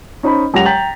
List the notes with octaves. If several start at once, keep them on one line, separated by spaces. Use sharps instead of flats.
C#4 D#4 C5 D#5 B5
F#2 G#3 G4 F#5 A#6 F7
G5 A#5 G6 A6 B6 F#7